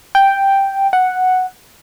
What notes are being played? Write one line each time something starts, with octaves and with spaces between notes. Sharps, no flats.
G5
F#5